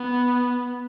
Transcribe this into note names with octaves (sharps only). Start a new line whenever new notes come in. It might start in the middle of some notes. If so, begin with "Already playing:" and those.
Already playing: B3